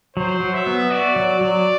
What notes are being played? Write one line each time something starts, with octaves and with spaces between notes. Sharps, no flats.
F#3 C5
F#3
E5
B3
F#4 D5
F#3
F#3